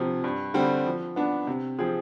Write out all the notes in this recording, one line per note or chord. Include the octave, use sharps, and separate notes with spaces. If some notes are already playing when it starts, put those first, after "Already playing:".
Already playing: D2 C3 F3
G2
D3 G3 C4
F3
B3 D4
C3
F3 C4 F4 G#4